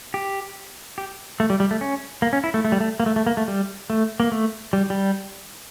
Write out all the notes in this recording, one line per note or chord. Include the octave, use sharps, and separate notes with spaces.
G4
G4
A3
G3
G3
A3
C#4
A#3
C#4
E4
A3
A3
G3
A3
A#3
A3
A3
A#3
A3
G3
A3
A#3
A3
G3
G3